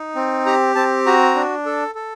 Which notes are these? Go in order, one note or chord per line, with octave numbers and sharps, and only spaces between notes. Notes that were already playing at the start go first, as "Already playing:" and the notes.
Already playing: D#4
C4
G4 A#5
C4 A5
F#4 A#5
D4
A4
A4